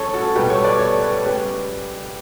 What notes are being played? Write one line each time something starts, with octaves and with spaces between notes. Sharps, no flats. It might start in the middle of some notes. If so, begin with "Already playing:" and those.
Already playing: C#3 E3 G3 A4 C#5
F#4 A4
B2 G3 G4 B4
A4 C#5
B4 D5
A4 C#5
B4
C#5
C#3 G3 G4 B4